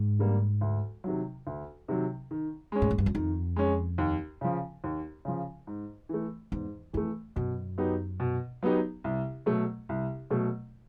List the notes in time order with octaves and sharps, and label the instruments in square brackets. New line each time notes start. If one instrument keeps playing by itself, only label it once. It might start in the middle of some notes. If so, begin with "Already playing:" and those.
Already playing: [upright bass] G#2
[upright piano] D3 G3 A#3
D2
C3 D#3 F#3
D2
C3 D#3 F#3
D#3
G#3 C#4
[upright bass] A2
G#2
G2
F#2
[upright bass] F2 [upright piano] D#3
[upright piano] G#3 C#4
D#2
C#3 F3
D#2
C#3 F3
G#2
E3 A3
[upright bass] E2 [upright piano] G#2
[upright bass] F2 [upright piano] E3 A3
[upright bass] F#2 [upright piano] B2
[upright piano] F#3 B3 D#4 G4
B2
F#3 B3 D#4 G4
C2
B2 F#3 A3
C2
B2 F#3 A3